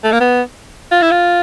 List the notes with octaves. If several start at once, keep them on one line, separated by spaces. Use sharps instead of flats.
A3
A#3
B3
F4
E4
F4